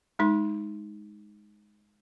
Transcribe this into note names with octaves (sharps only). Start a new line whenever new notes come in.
G#3 D#4 C6